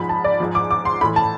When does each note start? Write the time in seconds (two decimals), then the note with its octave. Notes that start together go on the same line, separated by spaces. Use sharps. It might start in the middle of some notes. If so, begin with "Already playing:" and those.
Already playing: G#2 F3 B5
0.09 A5
0.24 D5
0.40 G#2 F3
0.55 D6
0.71 D6
0.85 C6
1.01 A2 E3 B5
1.16 A5